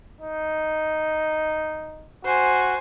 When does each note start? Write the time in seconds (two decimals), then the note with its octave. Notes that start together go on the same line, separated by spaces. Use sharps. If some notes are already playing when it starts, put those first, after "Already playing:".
0.21 D#4
2.25 F#4 C5 G#5